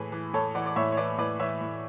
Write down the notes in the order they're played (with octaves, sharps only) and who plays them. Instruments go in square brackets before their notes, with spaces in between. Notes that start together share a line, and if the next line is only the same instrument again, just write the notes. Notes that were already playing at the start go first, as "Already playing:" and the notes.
Already playing: [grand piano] A2 E3 G#4 B4
E3
A2 A4 C#5
E3 D5 F#5
D5
A2 C#5 E5
C#5
E3 B4 D5
A2 B4 D5
E3 C#5 E5
A2